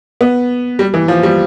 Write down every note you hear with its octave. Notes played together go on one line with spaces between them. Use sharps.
B3
G3
E3
F3
G3